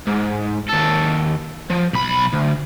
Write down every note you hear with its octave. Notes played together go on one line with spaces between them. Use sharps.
G#2
D#2 A4
F3
B1 B5
D2